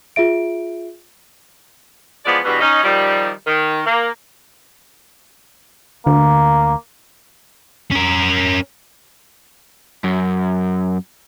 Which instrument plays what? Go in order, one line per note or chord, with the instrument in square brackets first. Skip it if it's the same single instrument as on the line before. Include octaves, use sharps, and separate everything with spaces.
[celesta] F4 G#4 E5 D7
[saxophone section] E3 F3 G#3 B3 D5
E2 G2 B2
C#4 D#4
D#3 F3 G3
D#3
A#3
[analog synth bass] D2 [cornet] A#3
[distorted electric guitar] C#4 A#4
[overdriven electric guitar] F#2